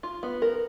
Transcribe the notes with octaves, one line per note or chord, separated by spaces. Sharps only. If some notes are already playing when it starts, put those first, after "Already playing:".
F4
B3
A#4